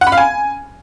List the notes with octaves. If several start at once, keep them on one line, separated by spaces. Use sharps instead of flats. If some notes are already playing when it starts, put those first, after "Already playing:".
F#5
B5
F5
G#5